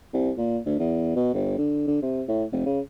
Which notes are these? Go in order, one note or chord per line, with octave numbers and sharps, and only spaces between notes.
C2
A#2
D2
E2
B2
G1
D3
D3
C3
A2
F1
C#3